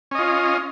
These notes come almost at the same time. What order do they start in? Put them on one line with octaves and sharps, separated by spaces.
C#4 D#5 F4